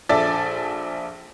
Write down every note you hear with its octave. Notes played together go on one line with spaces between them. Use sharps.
A#1 A4 D5 E5 A6